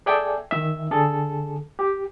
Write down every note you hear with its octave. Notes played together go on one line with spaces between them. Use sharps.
G#4 A4 D5 E5 G5 G#5
D#3 E5
D3 G#4 A4
G4